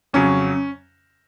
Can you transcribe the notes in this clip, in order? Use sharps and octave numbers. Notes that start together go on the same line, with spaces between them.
F2 C#3 F#3 C#4